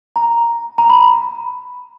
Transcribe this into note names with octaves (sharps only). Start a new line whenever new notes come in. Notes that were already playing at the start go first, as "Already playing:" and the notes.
A#5
A#5
B5